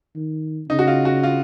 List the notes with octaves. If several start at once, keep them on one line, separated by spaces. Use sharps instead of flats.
D#3
C#3 D#4
F#4
F4
F#4
F4